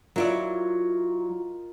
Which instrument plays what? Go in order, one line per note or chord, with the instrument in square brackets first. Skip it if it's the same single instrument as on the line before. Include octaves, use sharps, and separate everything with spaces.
[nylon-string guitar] F#3 E4 D5 [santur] F4 A#4 D#5